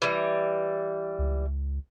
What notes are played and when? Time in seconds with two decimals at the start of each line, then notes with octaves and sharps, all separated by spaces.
0.02 E3 G3
1.19 C#2